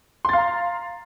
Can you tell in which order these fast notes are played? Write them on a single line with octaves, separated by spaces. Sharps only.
C6 A6 F5 A#5